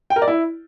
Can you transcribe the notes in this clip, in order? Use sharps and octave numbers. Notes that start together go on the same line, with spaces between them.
G5
A#4
D5
E4